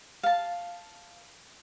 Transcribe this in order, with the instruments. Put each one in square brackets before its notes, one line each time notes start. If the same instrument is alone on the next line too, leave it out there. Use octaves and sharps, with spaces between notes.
[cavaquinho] F5 A5